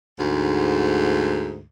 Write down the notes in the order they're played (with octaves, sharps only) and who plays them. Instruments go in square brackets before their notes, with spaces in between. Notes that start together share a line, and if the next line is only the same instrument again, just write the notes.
[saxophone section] D2 G#2